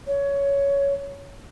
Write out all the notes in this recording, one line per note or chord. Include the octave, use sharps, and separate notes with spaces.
C#5